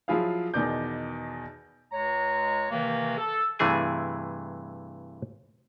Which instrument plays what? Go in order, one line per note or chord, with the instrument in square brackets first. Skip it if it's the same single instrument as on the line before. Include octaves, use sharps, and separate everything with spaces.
[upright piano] F3 F#3 E4 F4 G#4 F5
E2 B2 D#3 D5 D6 G6
[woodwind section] C#2 G#3 C#5 A#5
C3 D#3 E3 A#3
A4
[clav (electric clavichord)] G2 C3 E3 A3 G#4 G#5